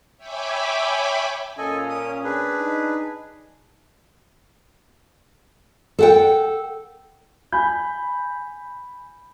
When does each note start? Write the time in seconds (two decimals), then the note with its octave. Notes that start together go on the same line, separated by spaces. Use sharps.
0.17 C#5 E5 G5 G#5 B5 D6
1.58 A#2 C#4 A4 D#5 G#5
1.89 D#6
2.24 D4 G#4 B4
2.59 D#4
5.99 A4 F#5 G5
7.52 G#5 B5 G6